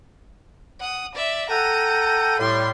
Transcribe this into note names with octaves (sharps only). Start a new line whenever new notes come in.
F#5 D#6
D5 E5
A4 F#5 G5 A#5 D#7
A2 G3 C#5 C6